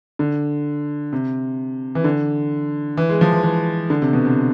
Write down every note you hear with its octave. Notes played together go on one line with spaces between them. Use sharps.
D3
C3
E3
D3
E3
G#3
F3
E3
E3
D3
C3
B2
C3